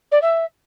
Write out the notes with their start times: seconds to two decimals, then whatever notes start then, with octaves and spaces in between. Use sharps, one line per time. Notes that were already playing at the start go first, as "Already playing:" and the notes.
0.12 D5
0.22 E5